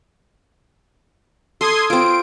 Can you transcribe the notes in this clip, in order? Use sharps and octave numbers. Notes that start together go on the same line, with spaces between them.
A4 C6 D#6 G#6
C4 F4 D7